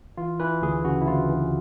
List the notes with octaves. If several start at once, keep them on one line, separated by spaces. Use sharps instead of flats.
E3 F4
E3 B4
D2 G#4
C#3 F#4
E4
D2 F4
E3